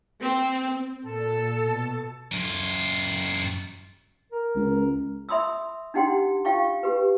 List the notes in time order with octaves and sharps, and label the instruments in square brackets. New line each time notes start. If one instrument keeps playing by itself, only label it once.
[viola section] C4
[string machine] A#2 [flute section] A4
[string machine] B2 A6
[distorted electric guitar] F#2 F4
[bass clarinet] A#4
[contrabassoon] C#2
[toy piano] E5 B5 C6 D#6 E6
D4 D#4 G4 F#5 G5 C6
F4 F5 G5 C#6
G4 B4